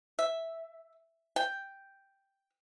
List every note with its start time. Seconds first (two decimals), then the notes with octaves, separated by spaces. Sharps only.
0.19 E5
1.36 G5